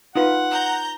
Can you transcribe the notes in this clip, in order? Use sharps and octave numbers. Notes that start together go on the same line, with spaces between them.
D#4 F4 B4 F#5
A#5 G6